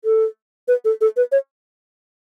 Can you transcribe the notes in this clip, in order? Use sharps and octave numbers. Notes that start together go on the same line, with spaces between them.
A4
B4
A4
A4
B4
C#5